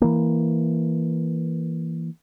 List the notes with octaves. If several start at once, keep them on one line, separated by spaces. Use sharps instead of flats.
E3 A#3